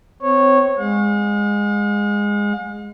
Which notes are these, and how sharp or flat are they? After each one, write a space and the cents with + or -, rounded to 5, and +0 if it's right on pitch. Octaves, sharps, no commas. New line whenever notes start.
C4 -25 C#5 -15
G#3 -15 F5 +45